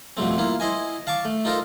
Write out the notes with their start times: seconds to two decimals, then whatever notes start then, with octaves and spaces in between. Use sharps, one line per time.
0.17 F2 B2 G3 A3 C4
0.38 A#3 E4 F4
0.60 E4 C5 D#5 G#5
1.07 F5 A5 C#6 D6
1.25 A3
1.45 D#4 F4 A4 A#4 C5